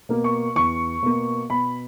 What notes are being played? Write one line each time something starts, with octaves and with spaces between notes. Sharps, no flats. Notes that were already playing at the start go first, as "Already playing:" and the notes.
B2 A#3
C#6
E2 C#6
B2 A#3
B2 B5